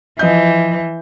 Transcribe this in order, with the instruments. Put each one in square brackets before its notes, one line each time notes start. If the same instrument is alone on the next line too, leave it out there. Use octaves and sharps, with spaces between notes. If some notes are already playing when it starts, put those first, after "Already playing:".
[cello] E3 [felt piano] F3 D#5 G6